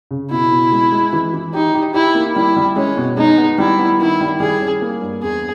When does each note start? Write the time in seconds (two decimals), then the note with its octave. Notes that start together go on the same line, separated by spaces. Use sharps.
0.11 C#3
0.31 B2 E4
0.52 B2
0.72 G#3
0.92 G#3
1.13 E3
1.33 E3
1.54 D#4 G4
1.75 G4
1.94 E4 G4
2.15 A#3
2.36 G3 E4
2.57 G3
2.76 G#3 C#4
2.97 B2
3.17 G#3 D#4
3.38 B3
3.58 G3 E4
3.79 B3
3.99 D#3 E4
4.21 G3
4.40 G3 G#4
4.61 C#4
4.82 A#3
5.02 G2
5.22 E2 G#4